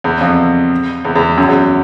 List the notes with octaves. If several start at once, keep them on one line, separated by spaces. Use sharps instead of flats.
E2
F2
E2
E2
F#2
E2